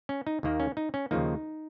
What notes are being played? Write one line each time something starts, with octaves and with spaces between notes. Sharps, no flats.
C#4
D#4
D#2 D#3 A#3
C#4
D#4
C#4
D#2 C#3 F3 A#3 D#4